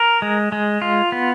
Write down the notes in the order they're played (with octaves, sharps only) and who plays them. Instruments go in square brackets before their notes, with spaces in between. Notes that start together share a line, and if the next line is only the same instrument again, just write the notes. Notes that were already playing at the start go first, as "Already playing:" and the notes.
Already playing: [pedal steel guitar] A#4
G#3
G#3
F4
B3